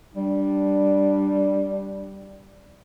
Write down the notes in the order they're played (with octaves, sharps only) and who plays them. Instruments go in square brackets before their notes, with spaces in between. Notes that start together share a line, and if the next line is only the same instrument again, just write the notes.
[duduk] G3 [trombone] D4